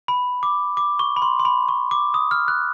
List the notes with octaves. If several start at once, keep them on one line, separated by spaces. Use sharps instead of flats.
B5
D6
D6
C#6
B5
C6
C6
B5
C#6
D6
D#6
F6
F#6